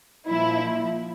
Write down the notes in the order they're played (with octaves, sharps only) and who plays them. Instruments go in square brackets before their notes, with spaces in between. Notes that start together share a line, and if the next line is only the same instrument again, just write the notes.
[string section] A#2 F3 E4